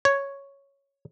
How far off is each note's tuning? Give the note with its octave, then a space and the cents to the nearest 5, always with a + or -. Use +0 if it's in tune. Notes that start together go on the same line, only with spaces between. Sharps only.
C#5 +0